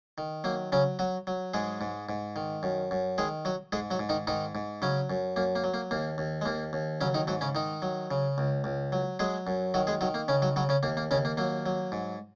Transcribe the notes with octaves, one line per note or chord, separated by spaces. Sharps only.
D#3
F#3 A#3
C#3 F#3 C#4
F#3 F#4
F#3
G#2 G#3 G#4
G#2
G#2
D#3
F#2
F#2
D#3 G#3 G#4
F#3 F#4
G#2 G#3 G#4
F#3 F#4
G#2
D#3 D#4
G#2 D#3 D#4
G#2
C#3 F#3 C#4
F#2
F#2 A#3
A#3
F#3
A#3
D#2 A#3
D#2
G#3
D#2 A#3
D#2
C#3 F#3 C#4
D#3 D#4
G#2 F#3 F#4
C#3 C#4
D#3 D#4
F#3
C#3
C#2
C#2
F#3
F#3 G#3 G#4
F#2
D#3 F#3 F#4
G#3 G#4
D#3 F#3 F#4
A#3
C#3 C#4
F#3 F#4
C#3 F#3 F#4
C#3 C#4
D#2 A#3
A#3
D#2 C#3 C#4
A#3
F#3 A#3
F#3
G#2